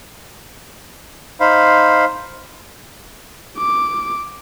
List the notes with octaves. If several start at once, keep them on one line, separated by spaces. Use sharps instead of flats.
D#4 C5 F5 B5
D6